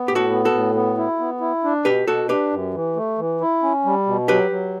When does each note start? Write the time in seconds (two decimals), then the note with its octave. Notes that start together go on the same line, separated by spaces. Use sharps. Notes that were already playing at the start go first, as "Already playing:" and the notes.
Already playing: B3
0.08 A2 G4
0.15 F#4 A4
0.30 B3
0.45 F#4 A4
0.53 A2
0.75 B3
0.98 E4
1.19 B3
1.41 E4
1.64 D4
1.85 B2 G4 B4
2.07 B2 F#4 A4
2.29 D4 G4 B4
2.51 F#2
2.74 E3
2.96 A3
3.18 E3
3.41 E4
3.63 C#4
3.85 G3
4.07 B2
4.28 F#3 G4 B4
4.51 F#3